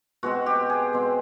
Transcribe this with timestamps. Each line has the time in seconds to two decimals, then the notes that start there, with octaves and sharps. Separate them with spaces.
0.23 B2 G#3 C4 F#4
0.46 G4
0.70 G#4
0.93 B2 G#3 C4